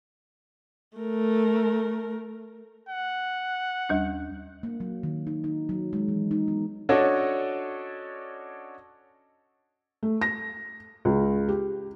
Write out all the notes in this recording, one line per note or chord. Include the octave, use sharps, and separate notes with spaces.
A3 A#4
F#5
D#2 G3 D4
A#3
F#3
D#3
D#4
D#4
F#3
G#3
E3
D#4
B3
C#4 D4 F#4 A4 C#5 D#5
A3
A#6
C#2
G4